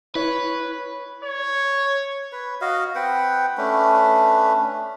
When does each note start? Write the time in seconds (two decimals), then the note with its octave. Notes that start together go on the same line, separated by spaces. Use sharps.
0.15 E4 B4 C#5
1.24 C#5
2.32 B4
2.61 F#4 D#5 F5
2.95 C4 B4 F#5 G5
3.58 A3 C#4 D4 B4